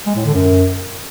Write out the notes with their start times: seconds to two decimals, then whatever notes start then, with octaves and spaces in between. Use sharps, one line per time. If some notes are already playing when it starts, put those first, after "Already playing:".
0.06 G#3
0.16 A2
0.25 D3
0.34 F#2